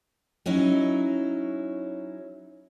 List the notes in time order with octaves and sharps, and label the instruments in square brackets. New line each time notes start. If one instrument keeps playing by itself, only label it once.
[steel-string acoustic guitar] F#3 C#4 D#4 E4